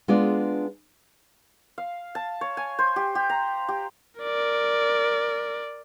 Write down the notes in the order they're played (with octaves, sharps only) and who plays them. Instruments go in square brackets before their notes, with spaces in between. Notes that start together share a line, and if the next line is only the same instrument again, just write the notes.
[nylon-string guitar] G#3 B3 D4 F4 G#4 D5
[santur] F5
A5
C#5
G#5
C5
G4
G4
A#5
G4
[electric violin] A#4 D5